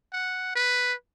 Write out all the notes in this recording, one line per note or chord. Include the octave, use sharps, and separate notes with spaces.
F#5
B4